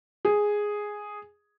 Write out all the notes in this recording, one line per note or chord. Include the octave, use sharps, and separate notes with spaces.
G#4